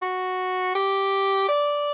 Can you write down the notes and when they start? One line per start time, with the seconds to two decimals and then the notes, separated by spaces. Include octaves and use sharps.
0.02 F#4
0.75 G4
1.49 D5